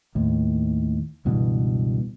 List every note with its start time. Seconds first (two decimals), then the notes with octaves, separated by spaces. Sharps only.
0.15 D#2 A2
1.25 C#2 G2 B2 E3